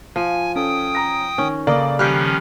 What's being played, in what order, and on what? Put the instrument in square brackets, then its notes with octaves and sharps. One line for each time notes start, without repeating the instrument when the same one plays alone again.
[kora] F3 [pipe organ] G#5
[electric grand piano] C#4 [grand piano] A4 [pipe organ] G5 D#6
[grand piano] A#5 A#6
[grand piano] D#3 [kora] C#4
[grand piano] C#3 A4 [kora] A#3 D#5 [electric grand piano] D5
[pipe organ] D#3 F3 C#4 [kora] G3 G4 [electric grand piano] F6 F#6 C7